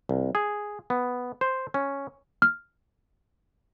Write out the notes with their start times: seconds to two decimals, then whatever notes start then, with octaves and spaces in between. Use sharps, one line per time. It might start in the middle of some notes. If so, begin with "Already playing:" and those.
0.09 C2
0.35 G#4
0.90 B3
1.41 C5
1.74 C#4
2.42 F6